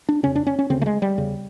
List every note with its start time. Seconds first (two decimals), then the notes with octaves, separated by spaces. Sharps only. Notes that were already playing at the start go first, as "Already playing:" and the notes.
0.09 D4
0.23 F2 C#3 C#4
0.35 D4
0.47 C#4
0.59 C#4
0.70 D2 C#3 C4
0.81 A3
0.86 G#3
1.02 G3
1.17 E2 C#3